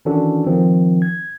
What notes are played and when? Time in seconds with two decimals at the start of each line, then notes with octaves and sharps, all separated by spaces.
0.05 D#3 E3 C#4 D4 F#4 A4
0.46 D#3 F3 C4
1.02 G#6